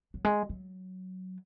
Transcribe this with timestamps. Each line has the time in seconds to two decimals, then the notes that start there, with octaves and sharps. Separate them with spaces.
0.14 F#3
0.24 G#3
0.49 F#3